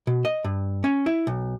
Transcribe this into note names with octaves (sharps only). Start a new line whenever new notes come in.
B2
D#5
G2
C#4
E4
B1